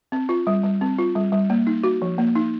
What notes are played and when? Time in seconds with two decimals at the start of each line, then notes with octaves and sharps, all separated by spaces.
0.12 C4
0.29 F4
0.47 G3
0.64 G3
0.81 C4
0.98 F4
1.15 G3
1.32 G3
1.50 A#3
1.67 D#4
1.84 F#4
2.02 F3
2.18 A#3
2.35 D#4